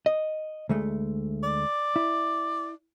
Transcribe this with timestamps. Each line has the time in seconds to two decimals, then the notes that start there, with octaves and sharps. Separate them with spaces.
0.06 D#5
0.69 D2 G#3 A3
1.43 D5
1.96 E4